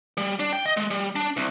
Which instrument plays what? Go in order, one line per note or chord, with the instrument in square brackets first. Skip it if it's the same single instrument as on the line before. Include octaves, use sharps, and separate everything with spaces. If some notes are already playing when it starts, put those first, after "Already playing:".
[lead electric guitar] G3
D4
G5
D#5
G#3
G3
D4
C2